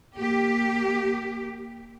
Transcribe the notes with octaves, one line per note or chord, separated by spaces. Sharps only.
A#3 G4